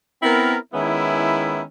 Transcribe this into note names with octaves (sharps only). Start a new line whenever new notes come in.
B3 C4 E4 A#4
D#3 G#3 B3 C#4 E4